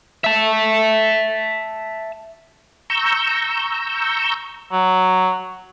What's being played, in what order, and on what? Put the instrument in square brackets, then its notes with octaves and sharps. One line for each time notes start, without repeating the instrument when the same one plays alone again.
[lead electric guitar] E5 A5
[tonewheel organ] A#5 C#6 E6 G6
[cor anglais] F#3